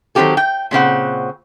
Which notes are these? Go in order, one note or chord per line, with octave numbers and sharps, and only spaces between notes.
D#3 F#3 C4 F#4 G4 A4
G5
A#2 C#3 C4 F#5